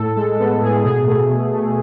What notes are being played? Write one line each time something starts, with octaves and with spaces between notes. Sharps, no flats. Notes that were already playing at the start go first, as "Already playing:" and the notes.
Already playing: A2 A4
G#3 A4
B3 A4
A2 G#4
B2 G#4
A3
B2
A3